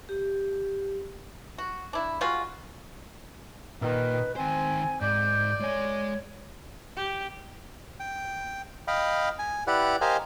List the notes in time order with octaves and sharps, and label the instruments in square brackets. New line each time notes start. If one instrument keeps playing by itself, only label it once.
[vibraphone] G4
[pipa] F#4
D4 E4
G3 G#3 F4 F#4
[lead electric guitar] A#2 [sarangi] D#3 [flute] B4
[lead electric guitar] D#3 C5 [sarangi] C4 [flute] G#5
[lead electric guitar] G#2 [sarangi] D5 [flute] G6
[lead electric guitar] G#3 G#5 [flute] C#5
[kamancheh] G4
[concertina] G5
D#5 F5 G5 B5
G#5
E4 G4 B4 D5 F#5
G4 A#4 C5 D#5 F5 G#5